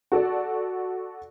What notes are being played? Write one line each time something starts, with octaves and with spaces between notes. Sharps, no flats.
F#4 A4 D5